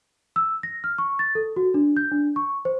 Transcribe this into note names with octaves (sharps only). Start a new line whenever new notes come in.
E6
A#6
F6
C#6
A6
A4
F#4
D4
G6
D4
C#6
C5